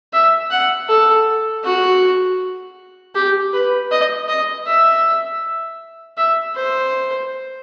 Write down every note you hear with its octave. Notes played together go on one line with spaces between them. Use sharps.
E5
F#5
A4
F#4
G4
B4
D#5
D#5
E5
E5
C5